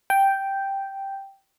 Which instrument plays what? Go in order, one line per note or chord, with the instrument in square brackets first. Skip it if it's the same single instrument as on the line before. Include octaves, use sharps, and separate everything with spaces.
[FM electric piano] G5